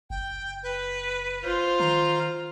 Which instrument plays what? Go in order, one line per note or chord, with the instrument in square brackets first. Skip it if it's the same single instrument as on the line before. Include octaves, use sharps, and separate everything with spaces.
[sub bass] F#1 [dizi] G5
[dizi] B4
[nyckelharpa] F4 C5
[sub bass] D#3 [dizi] A#5